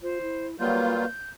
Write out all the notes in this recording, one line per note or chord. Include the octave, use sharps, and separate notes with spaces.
F4 C5
E4
F#3 G3 A#3 F4 B4 G6